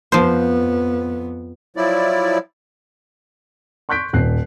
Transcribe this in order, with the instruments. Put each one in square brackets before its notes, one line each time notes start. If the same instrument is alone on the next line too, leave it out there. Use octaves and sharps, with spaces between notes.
[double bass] F2 B3 [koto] F3 C5
[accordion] F3 F#3 E4 D5
[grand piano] C6 C#6 F#6 G6 B6 D7
D#1 F#6 C7